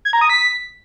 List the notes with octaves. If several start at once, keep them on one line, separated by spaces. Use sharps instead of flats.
G#6
A#5
D#6
B6